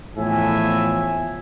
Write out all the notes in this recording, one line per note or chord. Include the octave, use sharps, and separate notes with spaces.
E2 A2 F3 E5 G#5